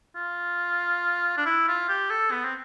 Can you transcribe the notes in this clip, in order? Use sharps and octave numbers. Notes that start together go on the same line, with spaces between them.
F4
D4
E4
F4
G4
A4
B3
C4